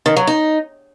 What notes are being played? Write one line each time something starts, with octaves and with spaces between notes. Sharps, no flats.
D#3
F#3
D#4